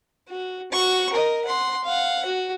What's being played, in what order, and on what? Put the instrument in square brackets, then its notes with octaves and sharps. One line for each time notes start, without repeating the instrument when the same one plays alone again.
[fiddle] F#4
F#4 C#6
A#4 D#5
F#5 C6
F5 F#5
F#4